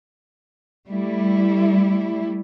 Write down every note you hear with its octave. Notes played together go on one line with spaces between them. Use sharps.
G3 A3 E4